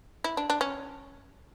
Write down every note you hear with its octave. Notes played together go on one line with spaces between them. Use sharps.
E4
D4
D4
C#4